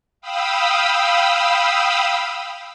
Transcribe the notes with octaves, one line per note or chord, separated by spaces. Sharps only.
F5 G5 B5 D#6 E6